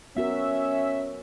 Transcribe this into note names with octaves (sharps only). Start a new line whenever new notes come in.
B3 C#4 F#4 A#4 E5